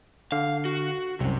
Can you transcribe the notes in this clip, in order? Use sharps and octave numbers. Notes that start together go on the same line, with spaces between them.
D3 F5 F6
F#4
C2 F#2 C3